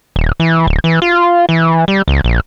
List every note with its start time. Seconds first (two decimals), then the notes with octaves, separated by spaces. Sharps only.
0.16 D#1
0.40 E3
0.67 D1
0.84 E3
1.02 F4
1.49 E3
1.88 G3
2.08 C#2
2.24 A#1